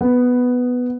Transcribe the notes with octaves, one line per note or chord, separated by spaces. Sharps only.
B3